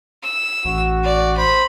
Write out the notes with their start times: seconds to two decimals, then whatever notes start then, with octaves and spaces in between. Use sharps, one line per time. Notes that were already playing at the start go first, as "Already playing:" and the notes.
0.23 E6
0.65 A1 F#4
1.03 D5
1.37 C5 B5